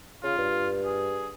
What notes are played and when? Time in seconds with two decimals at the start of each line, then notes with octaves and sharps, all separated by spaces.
0.24 C#3 F4
0.38 G2
0.85 G#4